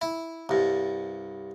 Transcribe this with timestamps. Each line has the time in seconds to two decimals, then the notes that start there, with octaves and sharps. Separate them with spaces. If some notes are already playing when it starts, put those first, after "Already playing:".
0.01 E4
0.49 C2 G2